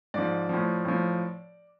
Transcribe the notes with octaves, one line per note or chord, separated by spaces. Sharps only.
G#2 F3 D5
A2 F3
A2 F3